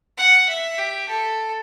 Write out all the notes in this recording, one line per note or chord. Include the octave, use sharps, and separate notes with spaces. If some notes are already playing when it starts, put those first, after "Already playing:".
F#5
E5
G4
A4